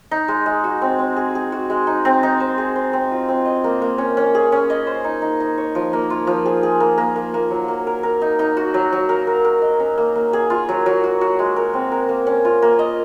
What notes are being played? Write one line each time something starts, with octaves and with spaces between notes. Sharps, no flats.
D#4
G#3
G#3
F#4
C4
C4
G#4
G#4
F#4
G#3
D#4
C4
D#4
C5
G#4
C5
C4
F4
C4
D#5
A#3
A#3
C#4
C#4
G#4
C#4
D#5
C5
D#4
D#4
D#4
C#5
F3
A#3
F4
F3
G#4
G#4
A#3
A#3
A#3
A#3
F#3
A#3
A#4
A#4
D#4
D#4
F#4
F#3
F#3
A#4
A#4
A#4
D#5
C#4
A#3
A#3
G#4
F4
F#3
F#3
F#4
F#4
G#3
A#4
C4
A#4
A#3
C#4
F4
A#3
D#5